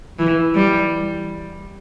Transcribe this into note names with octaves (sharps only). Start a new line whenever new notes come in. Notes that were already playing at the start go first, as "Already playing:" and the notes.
E3
G3